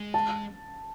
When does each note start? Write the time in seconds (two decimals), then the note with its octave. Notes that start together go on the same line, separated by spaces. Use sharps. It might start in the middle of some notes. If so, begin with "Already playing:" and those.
Already playing: G#3
0.14 A5